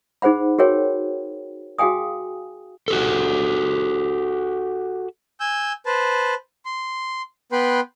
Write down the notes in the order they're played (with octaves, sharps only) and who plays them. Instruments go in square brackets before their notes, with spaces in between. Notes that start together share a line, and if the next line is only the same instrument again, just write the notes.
[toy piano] D#4 G#4 C5 F#5 B5
F#4 G#4 A#4 C#5 G5
F#4 G#4 F5 G5 G#5 D#6
[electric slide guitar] F#4 G4 A4
[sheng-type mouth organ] G#5 E6 G6
B4 C5 A5
C6
B3 B4 G5 C6